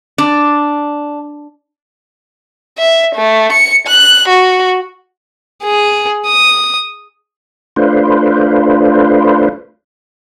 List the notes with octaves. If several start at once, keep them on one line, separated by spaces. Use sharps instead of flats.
D4
E5
A3
C#7
F#6
F#4
G#4
D#6
A3 D4 F4 B4 C5